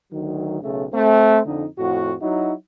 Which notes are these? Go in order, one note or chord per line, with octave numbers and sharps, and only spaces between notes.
D2 D#3 F#3
B1 C#3 A3
A3 C4
F2 D3 D#4
F2 A2 F#4
F#3 D#4 E4 F#4